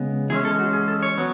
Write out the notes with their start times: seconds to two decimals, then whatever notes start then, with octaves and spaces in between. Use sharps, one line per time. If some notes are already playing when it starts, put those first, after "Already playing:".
Already playing: C#3 G#3 B3
0.30 E3 G#3 C#4 G#4
0.45 A4
0.59 F#4
0.73 G#4
0.88 A4
1.03 C#5
1.17 F#3 B3